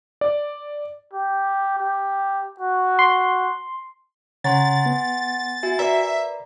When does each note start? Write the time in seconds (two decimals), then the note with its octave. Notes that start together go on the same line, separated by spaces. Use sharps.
0.21 D5
1.13 G4
1.78 G4
2.60 F#4
2.99 C6
4.44 C#3 C#5 F#5 G#5 A#5 C6 A6
4.86 B3
5.63 F#4 E5 G#5
5.79 A#4 B4 D5 E5 A#5